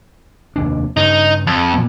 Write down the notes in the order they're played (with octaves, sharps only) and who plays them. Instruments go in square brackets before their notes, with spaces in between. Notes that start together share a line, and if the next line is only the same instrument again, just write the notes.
[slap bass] F1 D#2 D4
[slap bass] G2 C#3 [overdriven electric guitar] D#4
[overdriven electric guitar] F2
[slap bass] A#2 B3